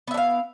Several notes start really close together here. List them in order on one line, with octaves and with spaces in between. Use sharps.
B3 E4 D4 F5